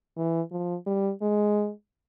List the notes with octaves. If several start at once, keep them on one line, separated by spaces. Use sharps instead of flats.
E3
F3
G3
G#3